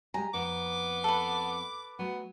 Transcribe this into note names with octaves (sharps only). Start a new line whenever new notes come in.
G#3 G4 G#5 A#5
F2 B3 D6
A4 B4
F#3 A3 B3